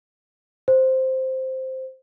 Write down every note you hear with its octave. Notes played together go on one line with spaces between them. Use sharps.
C5